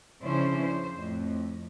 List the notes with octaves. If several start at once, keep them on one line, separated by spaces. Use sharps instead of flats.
C#3 F3 C#4 D4 E4 C5
C5
F2 A2